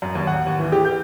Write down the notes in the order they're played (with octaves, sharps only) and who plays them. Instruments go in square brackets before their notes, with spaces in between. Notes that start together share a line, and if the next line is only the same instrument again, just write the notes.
[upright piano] F#2
D#2
F#5
D#2
E3
G4
G6